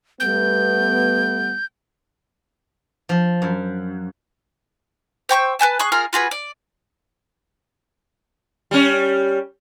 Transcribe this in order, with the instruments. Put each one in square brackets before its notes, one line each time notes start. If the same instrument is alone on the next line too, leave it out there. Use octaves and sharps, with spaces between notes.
[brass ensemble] G3 A3 B3 [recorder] G6
[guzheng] F3
F#2
[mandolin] C5 G5 C#6 E6
B4 C5 G#5 A5
G#4 C#6 F#6
F4 G#4 A#4 F6
F4 F#4 G#4 B4
D5
[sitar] G3 C#4